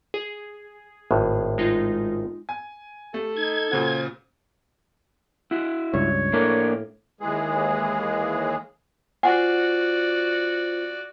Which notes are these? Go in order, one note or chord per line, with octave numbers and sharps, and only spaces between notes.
G#4
G#1 A2
G#3 D#4 F4
G#5
A3 G4 A4
D#4 G#6
A#2 C#3 F#4 C5
E4 F#4
C#2 G2 C#5
A2 A#3 D4 A#4
D#2 E3 G#3 G#4
F4 F#4 C5 D5 F#5 G#5